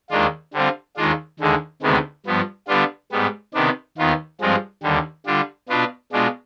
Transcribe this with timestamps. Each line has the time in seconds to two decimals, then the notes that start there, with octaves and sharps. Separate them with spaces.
0.10 D#2 D#3 G#3 D4 F4
0.54 D3 G3 C4 F4
0.97 D#2 D#3 G#3 D4 F4
1.40 D#2 D3 G#3
1.82 D2 C3 D#3 G#3 B3
2.26 G2 F3 B3
2.68 D3 G3 B3 D4 F4
3.12 G#2 G3 B3
3.54 C3 D#3 B3 D4
3.98 D#2 D#3 B3 F4
4.41 G2 F3 G#3 C4 F4
4.83 D#2 D3 G3
5.26 D3 G3 D4 F4
5.69 B2 B3 D4 F4
6.12 B2 G#3 D4 F4